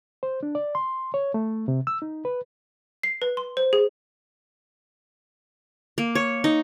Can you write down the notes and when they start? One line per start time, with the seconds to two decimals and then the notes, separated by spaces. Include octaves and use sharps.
0.23 C5
0.43 D4
0.55 D5
0.75 C6
1.14 C#5
1.34 A3
1.68 C3
1.87 E6
2.02 D#4
2.25 B4
3.03 C7
3.22 B4
3.37 C6
3.57 C5
3.73 G#4
5.98 A#3
6.15 C#5
6.44 D#4